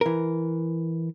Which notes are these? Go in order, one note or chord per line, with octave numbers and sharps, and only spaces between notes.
E3 A#4